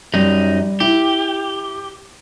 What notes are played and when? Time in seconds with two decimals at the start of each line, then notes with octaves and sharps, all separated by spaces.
0.14 F#2 G3 D#4
0.80 E4 G4